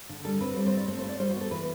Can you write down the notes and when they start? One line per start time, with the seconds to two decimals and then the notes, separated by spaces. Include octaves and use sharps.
0.09 D3
0.25 G3 A4
0.41 C4 B4
0.56 G3 C5
0.67 C5
0.72 C4
0.77 D5
0.88 A3 C5
0.99 C5
1.04 E4
1.09 D5
1.19 G3 C5
1.30 B3 F#4
1.41 A4
1.51 E3 B4